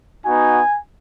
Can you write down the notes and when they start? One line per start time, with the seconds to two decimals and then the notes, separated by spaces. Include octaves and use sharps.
0.25 B3 D#4 F#4 G#5